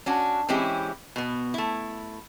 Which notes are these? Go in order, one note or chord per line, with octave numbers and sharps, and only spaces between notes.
C#4 D4 F#4
E3 G#3 C4 C#4 E4 G4
B2 B3
A3 E4